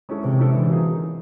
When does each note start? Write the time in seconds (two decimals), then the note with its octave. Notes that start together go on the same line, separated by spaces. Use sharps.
0.09 G#3 C#4 E4 A4
0.24 C3 E3
0.39 G#3 C#4 E4 A4
0.53 D3 E3
0.69 F#3 A#3 D#4 G#4